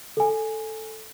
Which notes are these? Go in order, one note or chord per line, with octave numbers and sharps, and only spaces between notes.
A4 G#5